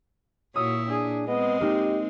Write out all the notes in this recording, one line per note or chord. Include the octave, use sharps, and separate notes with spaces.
A#2 E4 F#4 C#5 D#6 E6
D4 G#4
G#3 B3 C4 D#5
A#3 D#4 G4